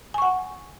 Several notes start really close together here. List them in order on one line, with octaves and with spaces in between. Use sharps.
G#5 C#6 F#5